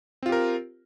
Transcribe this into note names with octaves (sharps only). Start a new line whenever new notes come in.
C4 F4 G4 A#4